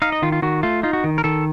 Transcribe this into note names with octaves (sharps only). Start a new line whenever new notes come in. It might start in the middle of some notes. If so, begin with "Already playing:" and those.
D#4 F5
D#5
D#3 F4
F4
D#3 F#4
A3 F4
D#4 F4
F#4
D#3
A#4
D#3 A4